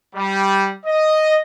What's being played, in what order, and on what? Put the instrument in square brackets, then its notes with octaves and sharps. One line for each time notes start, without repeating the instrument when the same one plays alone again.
[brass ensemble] G3
D#5